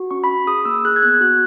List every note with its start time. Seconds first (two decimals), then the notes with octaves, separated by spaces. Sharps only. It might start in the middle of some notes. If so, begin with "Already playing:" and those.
Already playing: F#4
0.11 C#4 C#6
0.24 B5
0.29 C#4
0.47 G#4 D#6
0.65 A#3 E6
0.85 G#4 F#6
0.96 G#6
1.02 B3 F#6
1.14 G#6
1.21 F#4 F#6